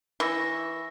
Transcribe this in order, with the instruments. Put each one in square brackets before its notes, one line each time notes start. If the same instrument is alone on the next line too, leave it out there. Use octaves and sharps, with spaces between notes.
[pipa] E3 [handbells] C#6 E6 A#6